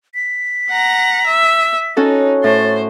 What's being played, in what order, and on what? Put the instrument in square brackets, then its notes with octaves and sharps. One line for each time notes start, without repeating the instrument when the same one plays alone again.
[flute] B6
[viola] F#5 A#5
E5
[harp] C#4 F#4 A4 [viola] D#4
[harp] A2 [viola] C5 [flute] A6